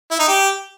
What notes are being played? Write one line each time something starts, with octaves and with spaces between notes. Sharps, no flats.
E4
D#4
G4